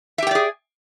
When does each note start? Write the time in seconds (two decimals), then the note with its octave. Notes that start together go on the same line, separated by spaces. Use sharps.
0.18 E5
0.22 G4
0.27 G5
0.31 D5
0.35 G#4